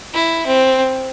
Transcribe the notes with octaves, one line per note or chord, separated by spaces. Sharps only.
E4
C4